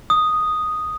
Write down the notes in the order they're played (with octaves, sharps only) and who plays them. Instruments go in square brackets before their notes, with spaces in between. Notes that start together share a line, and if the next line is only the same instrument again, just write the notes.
[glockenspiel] D#6